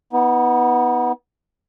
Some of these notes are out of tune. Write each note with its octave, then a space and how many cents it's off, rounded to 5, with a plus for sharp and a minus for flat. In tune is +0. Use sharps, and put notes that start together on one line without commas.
B3 +0 D#4 +45